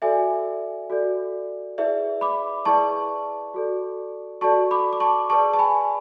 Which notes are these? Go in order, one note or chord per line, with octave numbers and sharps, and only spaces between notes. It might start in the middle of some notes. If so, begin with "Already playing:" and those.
F#4 A4 D5 E5 G#5
F#4 A4 D5
E4 G#4 B4 D5 E5
B5 D6
E4 G#4 B4 D5 A5 C#6
F#4 A4 D5
F#4 A4 D5 A5 C#6
B5 D6
D6
A5 C#6
G#4 B4 D5 A5 C#6
A5
G#5 B5